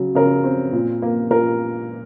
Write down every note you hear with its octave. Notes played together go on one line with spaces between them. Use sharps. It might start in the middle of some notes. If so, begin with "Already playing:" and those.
Already playing: C#3 F#3
C#3 A#4
C4
A#2
A#3
A#2 A#4